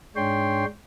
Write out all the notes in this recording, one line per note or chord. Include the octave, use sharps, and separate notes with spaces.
G#2 G#3 D4 C#5 G5 C6